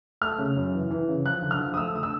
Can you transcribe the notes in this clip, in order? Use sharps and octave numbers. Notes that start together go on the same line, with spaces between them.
A3 F6
C#3
F#2
E3
E3
C#3
F3 F#6
D3
F6
F3
D#6
A3 E6
D3 D#6
E6